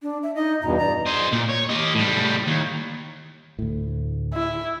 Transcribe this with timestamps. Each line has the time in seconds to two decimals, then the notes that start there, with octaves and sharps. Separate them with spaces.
0.02 D4
0.23 E5
0.36 D#4 D#5
0.62 E2 G2 B2 A#5
0.78 D5 A#5
1.07 C5 D#5
1.33 A#2
1.50 C#5
1.69 G4 D#5
1.95 A2 G3
2.47 D#2
3.59 D2 A2
4.33 E4